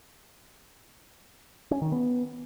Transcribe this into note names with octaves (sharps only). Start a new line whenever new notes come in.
C#4
D#3
B3